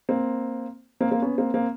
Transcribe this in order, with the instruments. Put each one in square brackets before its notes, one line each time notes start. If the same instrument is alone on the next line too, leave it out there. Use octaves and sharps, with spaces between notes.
[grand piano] A#3 C4
A#3 C4
A#3 C4
B3 C#4
A#3 C4
A#3 C4